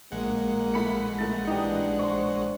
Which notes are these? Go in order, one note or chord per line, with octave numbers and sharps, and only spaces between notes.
A#1 G#3 A#3 F#5
A3 B5 C#7
A3 A#3 A6
E3 D4 D#4 G4
C5 C6 C#6